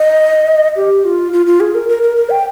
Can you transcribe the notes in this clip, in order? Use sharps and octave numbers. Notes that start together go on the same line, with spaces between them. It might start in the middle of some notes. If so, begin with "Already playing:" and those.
Already playing: D#5
G4
F4
F4
F4
G#4
A#4
A#4
A#4
A#4
G5